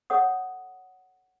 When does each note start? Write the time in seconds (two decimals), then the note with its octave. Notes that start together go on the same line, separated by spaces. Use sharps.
0.10 A4 C#5 F#5 D#6